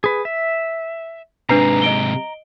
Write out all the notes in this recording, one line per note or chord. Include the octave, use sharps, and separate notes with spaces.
G#4 B4
E5
G#2 C3 D4 B4 A#5 C7
D#5 D7 G7